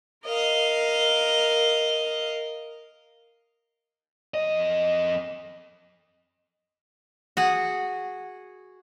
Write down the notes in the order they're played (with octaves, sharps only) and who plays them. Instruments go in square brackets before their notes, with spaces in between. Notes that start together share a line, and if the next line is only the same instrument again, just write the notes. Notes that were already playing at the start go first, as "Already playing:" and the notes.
[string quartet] A#4 D#5 F5
[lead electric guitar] F2 D#5
[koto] F#4 G#4 F#5